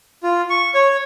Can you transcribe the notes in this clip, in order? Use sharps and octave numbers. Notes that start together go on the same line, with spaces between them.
F4
C#6
C#5